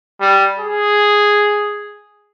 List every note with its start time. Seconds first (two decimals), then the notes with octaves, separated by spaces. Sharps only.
0.21 G3
0.60 G#4